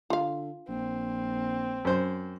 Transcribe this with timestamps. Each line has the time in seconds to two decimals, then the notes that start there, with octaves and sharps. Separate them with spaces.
0.10 D3 F4 F5
0.69 A#1 C4
1.85 F#2 C5